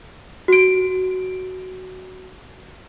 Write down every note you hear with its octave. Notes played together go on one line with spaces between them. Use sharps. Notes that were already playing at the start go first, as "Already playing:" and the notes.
F#4 D7